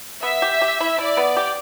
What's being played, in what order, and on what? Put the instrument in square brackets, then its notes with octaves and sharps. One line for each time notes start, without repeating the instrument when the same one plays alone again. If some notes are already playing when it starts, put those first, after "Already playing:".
[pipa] B3 [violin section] E5
[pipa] G4
G4
E4
[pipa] E4 [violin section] D5
[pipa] B3
G4